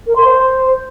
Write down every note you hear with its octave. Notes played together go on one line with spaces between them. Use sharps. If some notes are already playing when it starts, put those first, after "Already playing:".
A#4
C6
C5